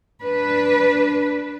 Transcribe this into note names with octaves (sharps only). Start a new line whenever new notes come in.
D4 B4